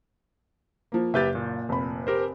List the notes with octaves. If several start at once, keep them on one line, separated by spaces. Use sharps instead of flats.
F3 A#3
F#1 G4 B4 E5 G6 A6
A#2
F1 B5
G4 A#4 C5